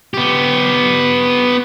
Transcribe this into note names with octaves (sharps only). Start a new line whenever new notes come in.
B3 G4